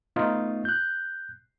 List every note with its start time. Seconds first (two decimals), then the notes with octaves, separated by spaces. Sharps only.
0.16 A3 B3 D#4 F4
0.65 F#6 G6